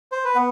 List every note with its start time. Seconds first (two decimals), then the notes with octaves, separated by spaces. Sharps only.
0.12 C5
0.25 B4
0.35 B3